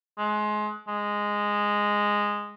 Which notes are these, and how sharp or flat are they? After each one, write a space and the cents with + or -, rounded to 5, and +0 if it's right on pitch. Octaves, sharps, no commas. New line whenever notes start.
G#3 +25
G#3 -10